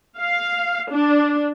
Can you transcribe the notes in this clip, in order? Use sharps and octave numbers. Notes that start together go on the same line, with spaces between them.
F5
D4